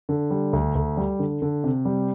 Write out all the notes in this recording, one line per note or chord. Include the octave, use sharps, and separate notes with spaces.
D3
G3
D2
D2
G3
D3
D3
C3
G3